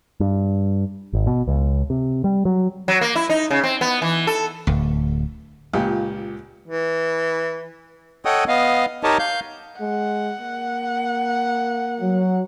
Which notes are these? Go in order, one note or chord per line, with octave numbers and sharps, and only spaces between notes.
G2
G#1
B2
C#2
C3
G3
F#3
F#3
A#3
E4
D#4
C#3
C4
B3
E3
A4
D1 D2
C#2 A#2 G4
E3
A4 C#5 D#5 F#5 G5 D#6
B3 D#5 F5
D#4 G4 A#4 C#5 D#5 A5
F5 G6
G#3 F#5
A#3
F#3